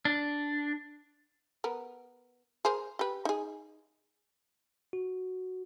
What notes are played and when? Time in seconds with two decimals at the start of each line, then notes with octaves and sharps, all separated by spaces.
0.05 D4
1.64 B3 A#4
2.65 G#4 A#4 C5
2.99 G4 B4
3.25 D#4 G#4
4.93 F#4